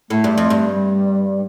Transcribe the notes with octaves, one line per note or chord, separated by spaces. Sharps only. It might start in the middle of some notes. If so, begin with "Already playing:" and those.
A2 A3
G2
F2
G2
G3